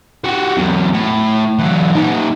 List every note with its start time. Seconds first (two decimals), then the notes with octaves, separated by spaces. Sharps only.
0.24 F#4 G4
0.57 E2 F#3
0.93 A2
1.59 E3 F#3
1.95 A#2 D#4